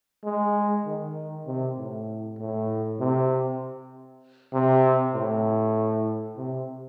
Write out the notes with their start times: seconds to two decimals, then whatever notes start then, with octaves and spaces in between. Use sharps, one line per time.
0.24 G#3
0.85 D#3
1.47 C3
1.78 A2
2.39 A2
3.00 C3
4.53 C3
5.15 A2
6.37 C3